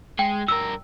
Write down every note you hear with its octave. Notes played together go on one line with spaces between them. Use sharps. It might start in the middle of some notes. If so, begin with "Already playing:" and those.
G#3 G5
G2 A#4 E6